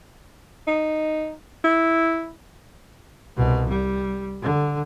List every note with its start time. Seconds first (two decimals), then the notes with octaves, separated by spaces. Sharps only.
0.67 D#4
1.64 E4
3.37 C2 B2
3.69 G3
4.42 D3